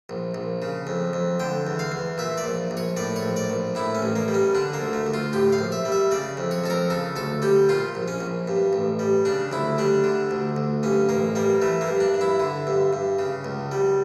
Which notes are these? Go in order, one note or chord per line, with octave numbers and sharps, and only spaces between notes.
A#1
A#1
C#3
F2
F2
D3 G5
E2
F5
E2
A#2 E5
D5
A#1
A#1
C#5
A2 D5
C#5
A#1
D5
A#1
A2 E4
C#4
A1
A#3
G3
C#4
D3 D4
A#3
D2
A3
D2
F4
A2 G4
F5
A#1
E5
G3
E5
C#3 D5
F2
C#5
F2 A4
A#4
C#3 A4
D2 A4
G3 G4
A#2 F4
A#1
C#4
A#1
G2
A1
G3
C#3 D4
D2 E4
G3 D4
D3
D2
D2
G2 C#4
A1 A#3
G3 A#3
E3 A3
A#3
G2
D4
G2
E4
D3
G2
G2
C#3
C#2
G3